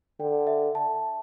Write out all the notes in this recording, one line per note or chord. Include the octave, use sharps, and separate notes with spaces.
D3 G5
E5
A5